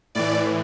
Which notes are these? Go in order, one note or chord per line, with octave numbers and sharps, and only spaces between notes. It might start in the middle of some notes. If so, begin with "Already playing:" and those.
A2 E3 D5